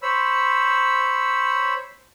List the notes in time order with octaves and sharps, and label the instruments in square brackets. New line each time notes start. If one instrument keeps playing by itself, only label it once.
[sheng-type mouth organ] C5 C#5 B5 E6